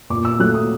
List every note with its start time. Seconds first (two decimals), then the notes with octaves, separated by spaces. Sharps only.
0.10 A#2 D6
0.25 E6
0.39 F#3 A3 F#6
0.54 D#6